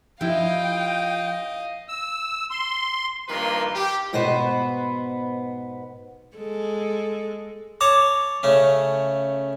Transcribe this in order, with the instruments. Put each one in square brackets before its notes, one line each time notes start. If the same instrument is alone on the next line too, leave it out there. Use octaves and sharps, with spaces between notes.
[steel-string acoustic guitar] F3 [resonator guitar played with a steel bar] E4 G4 [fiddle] D#5 F5 [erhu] G5
[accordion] E6
C6
[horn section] G2 D#3 F3 A#3 B4 C6
G4
[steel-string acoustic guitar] G#2 B2 B3 B4 C5
[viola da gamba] G#3 A4
[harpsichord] C#5 A5 A#5 [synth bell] D6
[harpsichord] C#3 A3 C#4